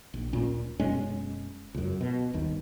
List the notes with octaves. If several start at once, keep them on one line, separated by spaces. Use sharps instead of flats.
A#1
D1 A#2 C#4
F#1 B2 G#3 C#4
C#2 F#2
B2
G1 D#2 D#3